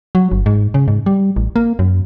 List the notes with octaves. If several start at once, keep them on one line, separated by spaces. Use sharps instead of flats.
F#3
G1
G#2
C#3
G#2
G3
A1
A#3
F#2